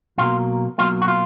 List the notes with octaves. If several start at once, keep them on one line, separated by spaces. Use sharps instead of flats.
B1 B2 F#3 A#3 F4
B1 B2 F#3 A#3 F4
F#4
F4